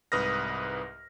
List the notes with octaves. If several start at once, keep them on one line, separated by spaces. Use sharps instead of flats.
C2 G#2 B4 D#6 F6 A#6